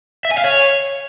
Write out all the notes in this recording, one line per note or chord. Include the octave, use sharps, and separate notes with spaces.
E5
G#5
F5
C#5